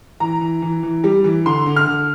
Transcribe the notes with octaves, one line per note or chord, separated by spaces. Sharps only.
E3 A#5
E3
E3
E3
G3
E3
D3 C6
D3
F6
D3